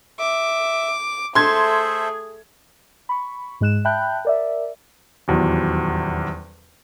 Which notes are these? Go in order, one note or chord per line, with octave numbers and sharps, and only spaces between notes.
E5 D6
A3 G#4 A4 C5 E5 C6 G#6
B5 C#6
G#2 G#3 F#6 E7
E5 G5 A5 B5 F#6 G6
A#4 D5 E5
D#1 E2 F#3